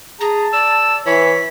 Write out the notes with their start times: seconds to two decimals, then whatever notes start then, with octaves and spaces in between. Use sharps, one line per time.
0.21 G#4 A5 A#5
0.53 D5 E6
1.06 E3 C#5 B6